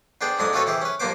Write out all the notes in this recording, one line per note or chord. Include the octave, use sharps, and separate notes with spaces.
B3 D4 G#4 C5 G5
F2 G#2 G#3 D4 G#5 D#6
C4 F4 F#4 A4 B4 C#5
C3 E3 E4 G4 G#4
C#4 B4
G2 F3 A#3 B3 C5 D6